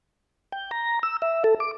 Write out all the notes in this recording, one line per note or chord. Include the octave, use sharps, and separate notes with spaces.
G5
A#5
E6
E5
A4
D6